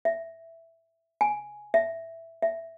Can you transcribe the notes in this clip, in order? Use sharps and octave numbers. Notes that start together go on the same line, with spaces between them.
E5
G#5
E5
E5